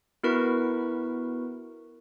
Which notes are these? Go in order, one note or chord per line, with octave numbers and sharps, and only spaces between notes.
B3 E4 F#4 A#4 B4 C#6